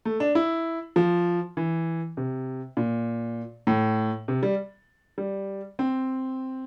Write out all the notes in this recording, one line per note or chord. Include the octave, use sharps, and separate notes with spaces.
A3
D4
E4
F3
E3
C3
A#2
A2
C3
G3
G3
C4